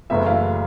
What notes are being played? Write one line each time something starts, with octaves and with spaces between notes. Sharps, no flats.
F#1 F#2 C#3 E3 A3 E5
F5